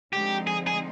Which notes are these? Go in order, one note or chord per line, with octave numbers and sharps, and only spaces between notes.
D3 F3 G#3 C4 D#4 G4
G#4
G#4